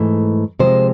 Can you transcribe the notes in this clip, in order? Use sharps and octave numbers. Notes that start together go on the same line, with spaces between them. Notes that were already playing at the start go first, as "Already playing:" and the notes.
Already playing: G#2 E3 A3
C3 F3 G#3 C5